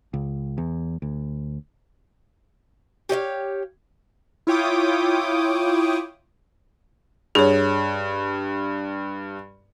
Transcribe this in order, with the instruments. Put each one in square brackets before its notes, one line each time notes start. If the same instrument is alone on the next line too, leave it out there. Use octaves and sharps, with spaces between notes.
[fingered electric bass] C#2
E2
D2
[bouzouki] G4 C#5 D#5 F5
[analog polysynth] E4 F4 C#5 G5 D6 D#6
[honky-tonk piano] G2 [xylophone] G#4 C#5